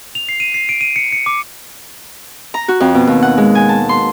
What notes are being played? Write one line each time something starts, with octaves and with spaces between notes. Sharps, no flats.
F7
C7
D#7
C7
D7
D#7
C#7
C#7
D6
A#5
F#4
F2
B2
D#2
F#5
G#3
G#5
A5
C6